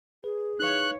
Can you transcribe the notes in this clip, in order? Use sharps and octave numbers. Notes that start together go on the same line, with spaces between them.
G#4 B4
E3 D#4 B4 C#5 F5 F#6